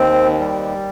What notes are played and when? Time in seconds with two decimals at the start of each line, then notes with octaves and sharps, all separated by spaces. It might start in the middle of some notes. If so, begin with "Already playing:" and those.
Already playing: D#2 C4
0.39 G3